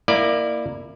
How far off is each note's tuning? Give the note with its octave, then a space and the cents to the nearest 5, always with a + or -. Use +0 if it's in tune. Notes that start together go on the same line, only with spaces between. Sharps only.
A#3 -5 E4 +0 D5 +20